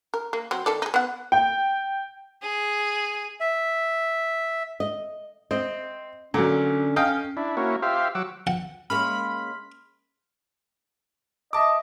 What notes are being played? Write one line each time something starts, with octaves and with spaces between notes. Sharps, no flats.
A#4
A#3
F#3 C4
D#3 A4 D5
D#4 G#4
B3 F#5
G5
G#4
E5
D#5
C4 D#5
A#2 D3 F#3 C#4
C#4 D#5 F5 G5
D4 E4
A#3 C#4 E4 F#4
F4 G4 C5 E5 F5
F#3 F#5 D6 E6
F#5
G#3 A#3 C#4 B5 C6 F6
D#5 E5 A5 D6